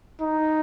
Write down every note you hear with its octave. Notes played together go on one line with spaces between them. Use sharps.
D#4